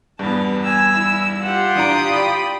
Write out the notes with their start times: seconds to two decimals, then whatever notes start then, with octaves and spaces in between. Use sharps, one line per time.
0.19 E2 G2 B3 A5
0.64 G#5 E6
0.96 E4
1.42 F4 G4 F#5
1.75 E3 D4 A#5 D#6 D7
2.09 D5 G5 B5